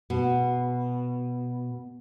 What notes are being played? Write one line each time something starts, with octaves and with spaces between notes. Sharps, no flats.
B2